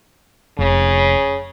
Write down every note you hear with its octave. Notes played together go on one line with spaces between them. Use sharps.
F1 C#3